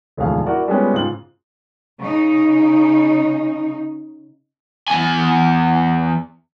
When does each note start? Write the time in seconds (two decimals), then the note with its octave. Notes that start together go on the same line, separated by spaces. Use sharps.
0.17 E1 D2 G#2 F3 G#4 F5
0.46 E4 F#4 A#4 D5
0.68 G3 G#3 B3 C#4 F4
0.93 G#2 C#3 F4 F#7
2.00 C#3 D#4
4.88 E2 G#5